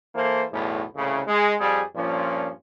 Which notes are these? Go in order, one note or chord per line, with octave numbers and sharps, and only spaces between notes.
E3 A#3 A4 C5
B1 E2 A2
C2 A2 C#3
G#3
F2 G3 G#4
G2 A#2 F3 C#4